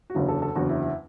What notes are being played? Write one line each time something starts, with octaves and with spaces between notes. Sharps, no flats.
F#4
F#1 E2 D3 F#3 E4
A4
A4
F#1 E2 D3 F#3 F#4
E4
E4